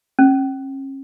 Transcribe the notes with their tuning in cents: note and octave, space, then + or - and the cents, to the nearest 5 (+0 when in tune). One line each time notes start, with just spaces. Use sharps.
C#4 -40